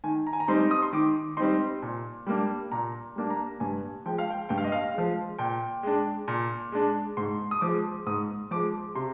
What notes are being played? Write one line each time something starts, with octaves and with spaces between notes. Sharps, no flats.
D#3 G#5
A#5
G#5
A#5
G3 C4 D#4 C6
D#6
C6
D#3 D6
G3 C4 D#4 C6
A#2
G3 A#3 D4
A#2 A#5
G3 A#3 D4
A#5
G2 G#5
F3 G#3 G5
F5
G5
G2 G5
F5
D#5
F5
F3 G#3
A#2 G5
G#3 D4
A#2
G#3 D4
G#2 C6
D#6
F3 G#3 D6
G#2 D#6
F3 G#3 D6
C3 C6